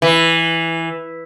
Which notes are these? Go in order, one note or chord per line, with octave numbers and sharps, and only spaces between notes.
E3